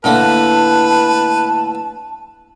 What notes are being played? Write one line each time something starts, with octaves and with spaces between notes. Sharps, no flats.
A2 D3 A#3 B4 A5